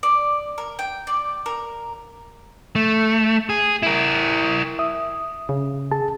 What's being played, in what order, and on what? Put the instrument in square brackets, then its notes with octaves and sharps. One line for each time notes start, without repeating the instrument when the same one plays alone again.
[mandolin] D5
A#4
G5
D5
A#4
[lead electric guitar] A3
G#4
E4 A#4
[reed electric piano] E5 D#6
[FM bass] C#3
[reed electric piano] G#4 A5